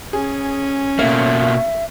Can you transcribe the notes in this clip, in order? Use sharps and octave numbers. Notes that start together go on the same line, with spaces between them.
C#4 G#4
B2 A3 A#3 C#5 E5 F5